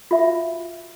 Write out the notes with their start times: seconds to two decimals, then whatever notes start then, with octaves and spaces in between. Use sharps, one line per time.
0.11 F4 F#4 E5 F5